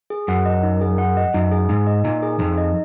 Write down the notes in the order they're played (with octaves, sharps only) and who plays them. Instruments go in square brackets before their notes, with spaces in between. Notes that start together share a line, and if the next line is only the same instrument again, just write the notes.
[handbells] G#4
[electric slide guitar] F#2 [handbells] F#5
[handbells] D#5
D#4
G#4
F#5
D#5
[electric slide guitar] F#2 [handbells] D#4
[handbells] G#4
[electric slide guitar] G#2 [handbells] D#4
[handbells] D#5
[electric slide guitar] A#2 [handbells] D#4
[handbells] G#4
[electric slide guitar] F2 [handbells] D#4
[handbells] D#5